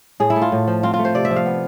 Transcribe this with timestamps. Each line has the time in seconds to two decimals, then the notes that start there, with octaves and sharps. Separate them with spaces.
0.20 A2 G#4
0.30 E4
0.36 A3
0.42 F4
0.52 A2
0.67 F3
0.83 C4 F4
0.94 F4
0.99 A3
1.05 C5
1.15 C3 D5
1.25 E5
1.31 F3
1.36 F5
1.46 B3